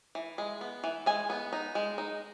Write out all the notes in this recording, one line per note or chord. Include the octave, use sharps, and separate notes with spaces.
E3
G#3
B3
E3
G#3 G#5
B3
D#4
G#3
D#4